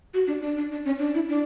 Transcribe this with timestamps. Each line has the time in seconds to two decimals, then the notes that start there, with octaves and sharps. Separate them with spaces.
0.14 F#4
0.27 D4
0.42 D4
0.57 D4
0.71 D4
0.85 C#4
0.99 D4
1.14 E4
1.29 D4